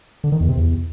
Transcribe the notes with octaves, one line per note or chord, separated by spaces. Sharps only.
D3
D#3
E2
C3
E2